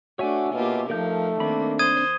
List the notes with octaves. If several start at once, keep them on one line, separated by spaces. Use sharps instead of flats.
A3 D4 F#4 C#5 E5 G#5
B2 A#3 F4 G4
F3 A3 D#4 A#4 F5 G6
D#3 A#3 C4 D4 B5
C5 D#6 G#6 D#7